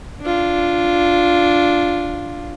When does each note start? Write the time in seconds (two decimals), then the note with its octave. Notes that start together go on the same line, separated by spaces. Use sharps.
0.21 D4 F4